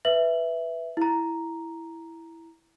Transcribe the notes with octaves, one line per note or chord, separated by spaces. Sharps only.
B4 E5 F#7
E4 A#5